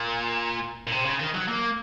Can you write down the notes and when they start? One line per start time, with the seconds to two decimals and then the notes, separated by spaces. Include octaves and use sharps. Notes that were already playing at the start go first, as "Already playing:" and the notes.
Already playing: A#2
0.87 A#2
0.92 C3
1.05 C#3
1.20 D#3
1.34 F#3
1.48 A#3